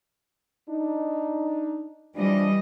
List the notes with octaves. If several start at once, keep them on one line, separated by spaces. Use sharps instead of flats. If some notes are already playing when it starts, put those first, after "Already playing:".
D4 D#4
E3 F3 G3 D4 D#5